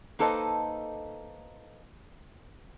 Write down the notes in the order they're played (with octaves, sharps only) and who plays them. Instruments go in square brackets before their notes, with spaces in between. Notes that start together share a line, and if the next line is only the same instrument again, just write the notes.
[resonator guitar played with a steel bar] A#3 D#4 A4 B4 C5 D#5